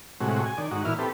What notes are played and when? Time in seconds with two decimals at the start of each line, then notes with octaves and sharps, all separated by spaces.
0.21 A2 C3 G#3 F#4
0.46 G#5
0.58 D#3 D5
0.71 G#2 D#4 F#4
0.85 A#2 E3 E4 F6
0.99 C4 G4 A4 B4